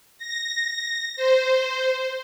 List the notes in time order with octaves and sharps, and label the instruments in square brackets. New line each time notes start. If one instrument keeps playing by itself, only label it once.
[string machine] A#6
C5